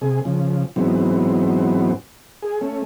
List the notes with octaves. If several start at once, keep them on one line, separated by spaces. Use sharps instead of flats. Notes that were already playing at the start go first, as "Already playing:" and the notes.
C3 G#4
C#3 F3
G#2 E3 F#3 B3 C4
G#4
A3 C#4